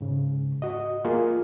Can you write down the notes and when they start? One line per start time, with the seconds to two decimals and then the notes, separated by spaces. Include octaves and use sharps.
0.01 G#2 C#3
0.62 F#4 D#5
1.05 A#3 F4 G#4